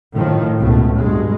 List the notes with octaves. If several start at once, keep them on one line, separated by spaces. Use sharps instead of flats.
A2 D#3 F3
C#2 B2 A3
G2 B2 G#3